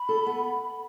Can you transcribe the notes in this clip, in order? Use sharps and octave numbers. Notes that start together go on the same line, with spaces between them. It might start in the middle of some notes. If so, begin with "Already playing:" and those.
Already playing: B5
A4
B3